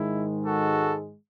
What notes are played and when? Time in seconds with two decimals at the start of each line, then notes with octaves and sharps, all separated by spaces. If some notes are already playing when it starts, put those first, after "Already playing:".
Already playing: G#2 D#3 G#3 E4
0.46 F#4 A4